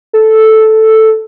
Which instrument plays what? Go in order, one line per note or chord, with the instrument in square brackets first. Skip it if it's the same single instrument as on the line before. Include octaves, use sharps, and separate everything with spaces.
[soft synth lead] A4